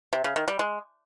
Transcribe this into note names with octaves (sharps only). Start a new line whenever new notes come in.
C3
C#3
D#3
G3
G#3